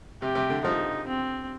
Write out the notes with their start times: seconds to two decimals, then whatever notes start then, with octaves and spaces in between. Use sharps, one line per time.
0.22 C3 G4
0.35 C3
0.50 D3
0.64 F3 D#4
1.07 C4